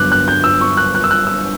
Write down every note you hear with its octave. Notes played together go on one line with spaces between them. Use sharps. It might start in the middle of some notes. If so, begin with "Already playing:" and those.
Already playing: G1 G2 F#3 B3 D4 D6 F#6
F#6
G6
E6
C#6
F#6
F#6
E6
F#6
E6